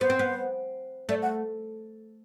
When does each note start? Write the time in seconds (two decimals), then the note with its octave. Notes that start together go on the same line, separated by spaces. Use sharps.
0.01 B3 C5
0.10 C4
0.19 B3
1.09 A3 D5
1.22 F#5